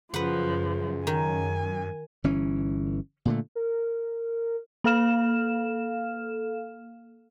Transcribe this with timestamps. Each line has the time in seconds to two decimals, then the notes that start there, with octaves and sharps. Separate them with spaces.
0.14 F#2 C#3 F3 B4 F#5
1.07 D#3 G#5
2.24 G1 E3 C#4
3.25 A#2 D3 A3
3.55 A#4
4.84 A#3 A4 F5 F6 E7